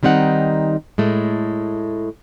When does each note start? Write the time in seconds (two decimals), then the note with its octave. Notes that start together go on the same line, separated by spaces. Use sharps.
0.03 D#3 G3 C4 D#4 F#5
0.98 A2 G#3 A3